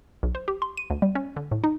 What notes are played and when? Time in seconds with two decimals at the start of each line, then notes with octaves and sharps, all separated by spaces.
0.23 B1
0.35 C5
0.48 G4
0.62 C6
0.77 D#7
0.90 D2
1.02 G3
1.15 C#4
1.36 D3
1.51 A2
1.64 D#4